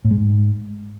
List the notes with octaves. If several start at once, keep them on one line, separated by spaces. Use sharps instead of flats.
A2
G#3
G#2